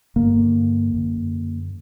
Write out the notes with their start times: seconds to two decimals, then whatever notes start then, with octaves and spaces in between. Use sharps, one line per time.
0.16 G2 D3 A#3
0.94 F#2 D3